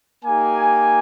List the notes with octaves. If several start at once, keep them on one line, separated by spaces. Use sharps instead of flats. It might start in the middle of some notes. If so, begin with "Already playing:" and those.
A#3 D#4 G4 G#5